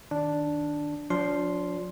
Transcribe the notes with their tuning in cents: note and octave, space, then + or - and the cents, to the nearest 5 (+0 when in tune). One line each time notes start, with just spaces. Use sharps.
D#3 +0 D4 +0
F3 +40 D4 -20 C6 +0